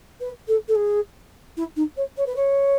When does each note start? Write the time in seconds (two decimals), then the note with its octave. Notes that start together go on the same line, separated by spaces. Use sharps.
0.20 B4
0.47 A4
0.68 A4
0.75 G#4
1.57 E4
1.76 D#4
1.96 C#5
2.17 C#5
2.26 B4
2.35 C#5